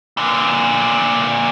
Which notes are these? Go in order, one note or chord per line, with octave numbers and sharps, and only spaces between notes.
A#2 D3